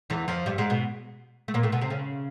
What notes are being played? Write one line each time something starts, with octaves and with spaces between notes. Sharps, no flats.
E2 E3
F2 F3
G2 G3
G#2 G#3
B2 B3
A3
A#2 A#3
A2 A3
B2 B3
C3 C4
C#3 C#4